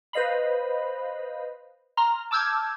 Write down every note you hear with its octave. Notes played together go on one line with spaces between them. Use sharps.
B4 C5 D#5 F5 B5
A#5 C6 F6
A5 D6 E6 F6 G6 G#6